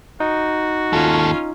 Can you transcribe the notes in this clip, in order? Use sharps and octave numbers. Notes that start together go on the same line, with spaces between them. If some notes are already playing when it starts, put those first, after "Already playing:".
D#4 F#4
D#2 C#4 F4 A4